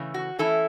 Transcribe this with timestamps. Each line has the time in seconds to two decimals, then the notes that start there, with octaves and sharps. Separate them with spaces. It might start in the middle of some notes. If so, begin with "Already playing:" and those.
Already playing: C#3 E3 A3
0.14 F#4
0.39 E3 A3 C#4 E4 A4